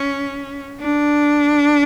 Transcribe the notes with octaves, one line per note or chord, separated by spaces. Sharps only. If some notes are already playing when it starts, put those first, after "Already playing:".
Already playing: C#4
D4